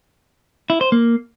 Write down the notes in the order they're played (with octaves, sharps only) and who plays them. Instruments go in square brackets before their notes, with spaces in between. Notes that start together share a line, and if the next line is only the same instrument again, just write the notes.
[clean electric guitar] E4
C5
A#3